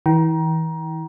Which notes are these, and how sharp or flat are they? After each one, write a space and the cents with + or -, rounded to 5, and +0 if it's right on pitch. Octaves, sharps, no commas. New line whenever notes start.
E3 -35 G5 -20 A#5 +25